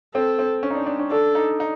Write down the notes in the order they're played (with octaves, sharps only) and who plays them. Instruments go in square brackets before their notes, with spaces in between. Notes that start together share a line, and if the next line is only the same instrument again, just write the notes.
[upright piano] C4 [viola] A4
[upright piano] C4
C#4
D#4
D4
D4
C#4
[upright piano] D4 [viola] A4
[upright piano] D#4
D#4